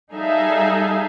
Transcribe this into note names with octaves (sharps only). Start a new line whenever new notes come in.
G3 D#4 G#4 A4 E5 F5